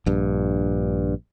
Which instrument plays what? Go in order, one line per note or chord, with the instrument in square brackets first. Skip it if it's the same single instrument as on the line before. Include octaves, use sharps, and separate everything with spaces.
[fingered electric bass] A#1 G2